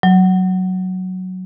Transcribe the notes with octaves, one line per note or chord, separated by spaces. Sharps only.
F#3